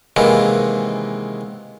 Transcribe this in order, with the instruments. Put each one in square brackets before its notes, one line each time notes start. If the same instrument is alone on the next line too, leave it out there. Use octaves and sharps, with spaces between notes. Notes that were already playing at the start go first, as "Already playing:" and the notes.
[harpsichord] C3 D#3 E3 G#3 A#3 B3